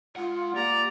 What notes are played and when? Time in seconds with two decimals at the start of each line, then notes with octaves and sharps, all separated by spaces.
0.16 G#3 F4 F#5
0.56 A#3 G4 D5 A#5